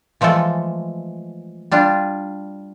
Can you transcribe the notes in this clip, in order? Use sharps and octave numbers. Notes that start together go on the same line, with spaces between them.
E3 F3 G#3 A3 A4
G3 D4 F4